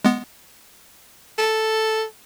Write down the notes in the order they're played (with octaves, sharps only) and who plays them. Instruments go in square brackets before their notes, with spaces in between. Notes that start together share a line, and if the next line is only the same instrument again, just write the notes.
[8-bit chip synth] G#3 B3
[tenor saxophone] A4